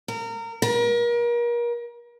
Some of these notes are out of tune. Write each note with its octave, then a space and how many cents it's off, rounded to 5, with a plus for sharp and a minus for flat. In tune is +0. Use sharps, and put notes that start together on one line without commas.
A#4 -25
A#4 +35